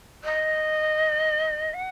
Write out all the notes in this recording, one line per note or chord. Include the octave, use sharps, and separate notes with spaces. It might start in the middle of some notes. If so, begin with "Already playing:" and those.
D#5
F#5